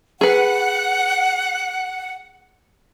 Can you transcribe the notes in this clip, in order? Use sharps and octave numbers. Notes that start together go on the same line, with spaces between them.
G#4 B4 F#5